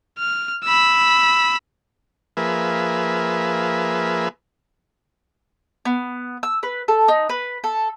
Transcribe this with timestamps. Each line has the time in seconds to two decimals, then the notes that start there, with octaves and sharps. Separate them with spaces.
0.18 F6
0.65 B5 E6
2.37 F3 A#3 G#4 B4 E5
5.85 B3
6.43 E6
6.63 B4
6.88 A4
7.08 D#4
7.29 B4
7.64 A4